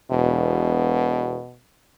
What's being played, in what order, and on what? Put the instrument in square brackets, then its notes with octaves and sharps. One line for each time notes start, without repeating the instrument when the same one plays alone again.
[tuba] E1 [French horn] B2